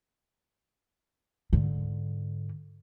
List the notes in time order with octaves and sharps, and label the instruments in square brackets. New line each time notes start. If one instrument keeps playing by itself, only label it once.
[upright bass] G#2 D3